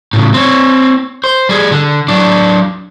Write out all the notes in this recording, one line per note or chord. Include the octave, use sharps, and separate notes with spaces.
A2 C#3
C4 C#5
C5
G3 G#4
D3
F#3 D4